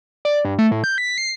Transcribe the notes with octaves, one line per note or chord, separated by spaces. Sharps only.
D5
G2
A3
A2
G6
B6
C7